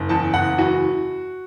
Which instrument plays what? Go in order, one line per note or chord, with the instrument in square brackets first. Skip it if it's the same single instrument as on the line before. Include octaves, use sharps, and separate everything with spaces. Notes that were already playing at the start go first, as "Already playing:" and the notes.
Already playing: [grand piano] F#1
E2 A5
F#1 F#5
E3 F#4